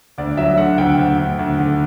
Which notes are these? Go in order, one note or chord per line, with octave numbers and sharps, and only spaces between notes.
D2 D5
F#3 E5
D3 F#5
D2 G5
D2
D2
D2
D3